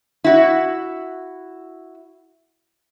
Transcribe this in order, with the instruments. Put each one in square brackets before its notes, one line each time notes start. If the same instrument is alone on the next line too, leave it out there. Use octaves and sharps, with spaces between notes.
[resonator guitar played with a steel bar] E4 F#4